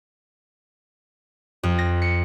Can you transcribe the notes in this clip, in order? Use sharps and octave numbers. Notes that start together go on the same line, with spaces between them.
F2
A#6
C#7